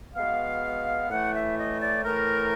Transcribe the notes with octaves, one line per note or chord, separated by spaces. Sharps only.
B2 G#3 B3 F5
A2 E3 A3 F#5
E5
D#5
D5
A2 E3 A3 A#4